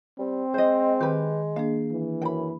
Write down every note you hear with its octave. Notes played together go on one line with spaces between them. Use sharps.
G3 C4
G#3 C5 D#5
D#3 G4 B4
A#3 D4 G#4 F5
E3
F#2 G5 B5